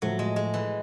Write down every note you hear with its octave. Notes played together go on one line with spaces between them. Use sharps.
A2 F3 F#3 A3
G#3
G#3
E3